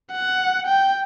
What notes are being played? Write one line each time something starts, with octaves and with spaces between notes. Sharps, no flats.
F#5
G5